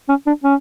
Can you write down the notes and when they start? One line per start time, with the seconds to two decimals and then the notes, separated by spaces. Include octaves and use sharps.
0.09 C#4
0.27 D4
0.44 C#4